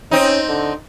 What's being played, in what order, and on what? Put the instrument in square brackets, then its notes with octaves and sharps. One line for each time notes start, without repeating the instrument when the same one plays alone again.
[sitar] C4 D#4 [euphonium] C#4
[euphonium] D3